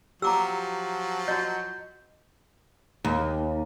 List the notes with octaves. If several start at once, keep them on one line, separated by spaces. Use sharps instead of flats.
F3 F#3 G4 A#5 D6 E6
F#4 D#5 G6
D#2